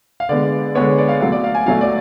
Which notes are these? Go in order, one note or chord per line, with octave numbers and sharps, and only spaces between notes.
F5
D3 G#3 B3 D5
D3 G#3 B3 C#5
D5
F5
B2 F#3 A3 F5
D5
F5
G#5
B2 F#3 A3 F5
D5